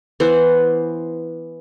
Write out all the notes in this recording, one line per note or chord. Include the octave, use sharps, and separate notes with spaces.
E3 B3 C5 F#5